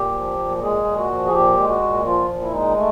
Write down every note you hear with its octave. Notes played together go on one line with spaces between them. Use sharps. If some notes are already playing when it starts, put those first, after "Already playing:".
Already playing: A#2 G4
F3
A#2
G#3 G#4
A#2
F#4
F3
G#4
A#2 G4
G#3
F#4
A#2
F3 F4
A#2
E4
G#3 D#4
A3